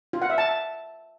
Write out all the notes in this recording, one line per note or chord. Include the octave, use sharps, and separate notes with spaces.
F4
F#5
E5
A5